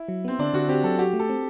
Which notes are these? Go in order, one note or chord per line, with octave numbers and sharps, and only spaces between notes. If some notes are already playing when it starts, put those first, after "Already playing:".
Already playing: E4
F#3
B3 C4
D3 D4
D3 F#4
C4 G4
F#3 A4
F#4 G4
A3
A4
C4